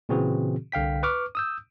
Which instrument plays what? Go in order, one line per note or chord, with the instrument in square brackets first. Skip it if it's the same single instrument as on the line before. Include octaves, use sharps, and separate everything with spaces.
[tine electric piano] A#2 C#3 E3 C4 F#4 G#4
C2 D3 F5 G5 B6
B4 C#6 D6 F6
D#6 E6 G6